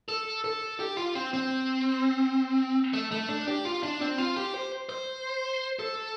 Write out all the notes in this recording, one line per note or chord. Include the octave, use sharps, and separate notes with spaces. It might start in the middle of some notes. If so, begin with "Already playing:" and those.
A4
A4
G4
F4
C4
C4
A3
A3
D4
G4
F4
D4
C4
F4
G4
C5
C5
A4